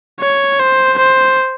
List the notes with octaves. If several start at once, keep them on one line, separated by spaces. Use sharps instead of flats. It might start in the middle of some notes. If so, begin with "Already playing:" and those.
C#5
C5
C5